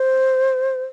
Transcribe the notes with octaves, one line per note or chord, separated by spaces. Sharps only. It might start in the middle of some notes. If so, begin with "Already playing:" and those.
Already playing: C5